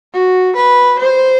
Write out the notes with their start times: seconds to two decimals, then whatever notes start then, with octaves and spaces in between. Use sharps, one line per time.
0.14 F#4
0.56 B4
0.99 C5